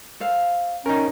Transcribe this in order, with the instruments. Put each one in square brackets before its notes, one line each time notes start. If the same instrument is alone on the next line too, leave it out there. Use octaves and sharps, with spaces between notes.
[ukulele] A4 C5 F5
[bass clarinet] C#4 [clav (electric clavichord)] D#4 A#4